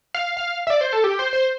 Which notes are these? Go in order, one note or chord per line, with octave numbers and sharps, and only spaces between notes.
F5
F5
E5
D5
C5
A4
G4
C5
C5